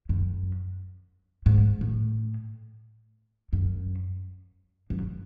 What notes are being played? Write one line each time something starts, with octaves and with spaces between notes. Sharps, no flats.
F#2
G#2
A2
F#2
F#2